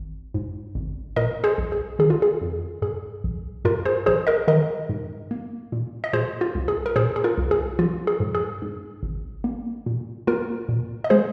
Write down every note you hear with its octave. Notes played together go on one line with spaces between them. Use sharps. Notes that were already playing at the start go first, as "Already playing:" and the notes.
Already playing: G#1
G#2
G#1
A#2 A#4 D#5
G#4 C5
A#1
G#4
D#3 G#4
F4
G#4
F2
G#2 G#4
A#1
G#2 F4 A#4
G#4 C5
A#1 G#4 C5
A#4 D#5
D#3 A#4 D#5
G#2
A#3
A#2
D#5
A#2 G#4 C5
F4
C2
G#4
A#4
A#2 G#4 C5
G#4
F4 A#4
C2
G#4
F3 F4
G#4
G#2
G#4
G#2
G#1
A#3
A#2
A#3 F4 A#4
A#2
D#5
G#3 G#4 C5